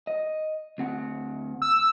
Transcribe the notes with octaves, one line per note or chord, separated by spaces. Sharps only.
D#5
D2 C4 F#5
E6